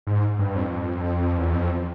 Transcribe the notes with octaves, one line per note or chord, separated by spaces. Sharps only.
G#2
G2
F2
E2
F2